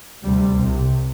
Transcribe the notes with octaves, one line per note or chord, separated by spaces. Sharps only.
D2 C3 G3
C2 C3